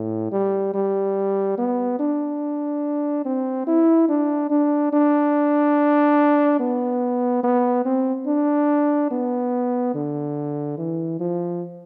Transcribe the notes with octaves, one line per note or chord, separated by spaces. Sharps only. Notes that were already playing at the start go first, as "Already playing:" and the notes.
Already playing: A2
G3
G3
B3
D4
C4
E4
D4
D4
D4
B3
B3
C4
D4
B3
D3
E3
F3